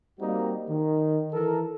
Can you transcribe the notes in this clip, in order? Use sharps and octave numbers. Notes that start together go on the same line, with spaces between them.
G3 A#3 C4 D#4 F#4 G4
D#3
E3 A4 A#4